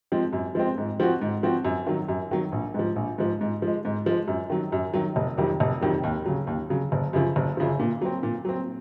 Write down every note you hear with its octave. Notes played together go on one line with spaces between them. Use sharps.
F3 G#3 C4
F#2
F3 G#3 C4
G#2
F3 C4 F#4
G#2
F3 C4 F#4
F#2
D#3 F#3
F#2
D#3 F#3
A#1
G#2 F3
A#1
G#2 F3
G#2
F3 G#3
G#2
F3 G#3
F#2
D#3 F#3
F#2
D#3 F#3
F1
F2 C3 D#3 F#3
F1
F2 C3 D#3 F#3
D#2
C#3 F#3
D#2
C#3 F#3
F#1
F#2 C#3 F3
F#1
F#2 C#3 F3
A#2
F#3 C4
A#2
F#3 C4